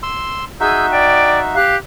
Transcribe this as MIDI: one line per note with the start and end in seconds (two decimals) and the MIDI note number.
0.03 0.44 84
0.03 0.44 88
0.60 1.56 63
0.60 1.56 66
0.60 0.86 68
0.60 1.56 76
0.60 0.86 88
0.60 0.86 91
0.92 1.38 74
0.92 1.38 79
1.55 1.74 67
1.55 1.74 77
1.55 1.74 90